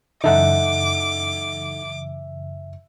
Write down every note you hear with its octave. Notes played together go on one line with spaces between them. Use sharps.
F#2 C#3 E3 D#4 A4 E5 F#5 D6